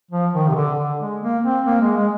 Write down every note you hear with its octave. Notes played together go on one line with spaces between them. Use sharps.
F3
D#3
C3
D3
D3
G#3
A#3
C4
A#3
G#3
G#3